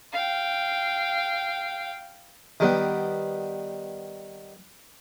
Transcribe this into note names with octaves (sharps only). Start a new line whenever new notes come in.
F5 G5
D#3 G3 B3